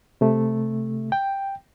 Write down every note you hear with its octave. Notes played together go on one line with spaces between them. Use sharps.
C3 A3
G5